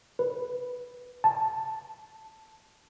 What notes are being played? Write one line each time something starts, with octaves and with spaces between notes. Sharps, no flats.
B4
A5